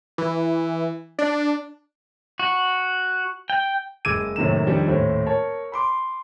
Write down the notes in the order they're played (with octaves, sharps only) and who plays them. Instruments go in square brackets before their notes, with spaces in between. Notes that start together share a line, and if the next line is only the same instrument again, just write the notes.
[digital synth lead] E3
D4
[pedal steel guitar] F#4
G5
[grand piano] F#1 G#3 D6 E6 G#6 D#7
F#2 A2 C3 D#3 A#3 E7
F2 D#3 G3 D4
D#1 A2 C5
A#4 C#5 A5
B5 C6 D6